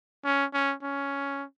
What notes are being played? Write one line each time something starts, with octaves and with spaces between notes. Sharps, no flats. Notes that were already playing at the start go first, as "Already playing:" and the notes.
C#4
C#4
C#4